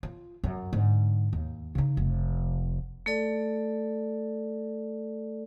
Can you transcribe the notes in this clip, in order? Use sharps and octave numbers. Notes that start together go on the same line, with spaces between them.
F4
F#2
G#2 D3
D#2
C#3 D#4
F1
A3 A4 D5